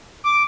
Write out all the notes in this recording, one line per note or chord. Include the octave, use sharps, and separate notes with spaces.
D6